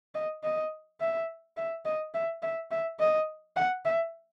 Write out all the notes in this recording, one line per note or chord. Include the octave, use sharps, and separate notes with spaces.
D#5
D#5
E5
E5
D#5
E5
E5
E5
D#5
F#5
E5